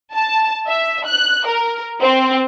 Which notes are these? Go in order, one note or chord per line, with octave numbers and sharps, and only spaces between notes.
A5
E5
F#6
A#4
C4